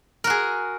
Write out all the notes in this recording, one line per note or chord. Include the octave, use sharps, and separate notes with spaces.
F#4 G#4 A#4